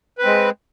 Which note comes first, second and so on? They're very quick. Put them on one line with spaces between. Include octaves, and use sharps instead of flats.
B4 C4 G#3